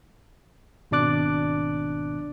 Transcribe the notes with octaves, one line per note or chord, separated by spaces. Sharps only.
G#1 B2 D4 D5 D6 F#6